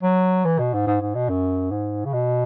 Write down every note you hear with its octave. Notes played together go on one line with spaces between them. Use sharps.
F#3
E3
B2
G#2
G#2
G#2
B2
F#2
G#2
C#3
B2